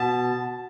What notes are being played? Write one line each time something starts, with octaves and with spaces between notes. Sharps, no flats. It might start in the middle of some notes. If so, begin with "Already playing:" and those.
Already playing: B2 A5